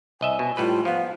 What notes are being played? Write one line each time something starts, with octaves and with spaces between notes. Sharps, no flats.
C2 D#5 E5 G#5
B2
A2 G3 F4 B4
F3 B3 F5